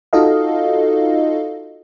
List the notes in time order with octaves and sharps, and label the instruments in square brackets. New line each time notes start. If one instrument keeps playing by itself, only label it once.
[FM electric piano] D#4 F4 F#4 A4 D#5 F5